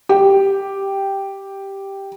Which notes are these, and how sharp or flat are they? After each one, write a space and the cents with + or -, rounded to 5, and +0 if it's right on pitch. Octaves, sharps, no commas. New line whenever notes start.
G4 +0